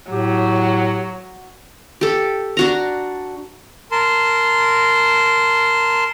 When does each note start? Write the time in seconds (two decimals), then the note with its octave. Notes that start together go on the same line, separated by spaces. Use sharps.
0.11 A2 F#3 G4
2.01 G4 A4
2.57 D4 F#4 A#5
3.92 A#4 A5 C6